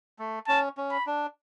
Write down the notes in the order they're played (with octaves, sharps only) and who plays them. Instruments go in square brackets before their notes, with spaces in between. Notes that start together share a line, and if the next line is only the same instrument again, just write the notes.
[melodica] A3
[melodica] C#4 [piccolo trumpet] A5
[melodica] C#4
[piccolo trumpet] B5
[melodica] D4